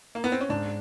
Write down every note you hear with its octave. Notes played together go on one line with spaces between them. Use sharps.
A#3
B3
C4
C#4
G#2 D4